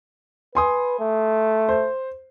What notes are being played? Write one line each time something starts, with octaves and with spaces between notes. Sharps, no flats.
B4 G#5 C6 D#6
A3
C5